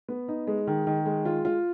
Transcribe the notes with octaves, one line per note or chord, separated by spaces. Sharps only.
B3
D#4
G#3
D#3
D#3
G#3
F4
F4